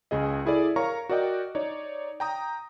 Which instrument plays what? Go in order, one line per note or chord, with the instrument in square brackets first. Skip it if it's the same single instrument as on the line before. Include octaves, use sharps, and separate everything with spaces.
[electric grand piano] C#2 C#3 G#4 D#5
E4 G#4 A4 D5
A#4 C#5 F5 A#5 C#6
F#4 A#4 D5 D#5 G5
D#4 C#5 D5
G5 A#5 D#6